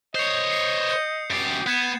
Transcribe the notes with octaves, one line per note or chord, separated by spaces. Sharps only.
C5 C#5 D#5 D#6 G6 C7
C7
G6 C#7
F#2 G4 A6 C7
B3 F#6 G#6 E7